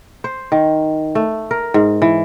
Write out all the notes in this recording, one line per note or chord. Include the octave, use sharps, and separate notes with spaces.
C5
D#3
A3
A#4
G#2
E3